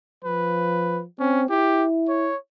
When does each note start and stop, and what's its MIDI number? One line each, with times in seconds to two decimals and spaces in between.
0.24 1.05 53
0.24 1.01 71
1.19 1.45 60
1.19 1.44 61
1.50 2.31 64
1.50 1.85 67
2.08 2.36 73